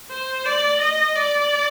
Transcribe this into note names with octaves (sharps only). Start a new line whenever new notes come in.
C5
D5
D#5
D5